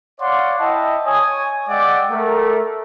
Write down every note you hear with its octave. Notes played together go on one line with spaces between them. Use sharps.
C#5 D5 F5 F#5 C6
E4 D#5 E5 G5 A5
C#5 G#5 D#6
G#3 D5 E5 F#5 G5 D6
A3 A#4